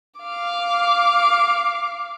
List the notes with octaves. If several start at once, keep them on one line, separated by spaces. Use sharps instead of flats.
F5 D6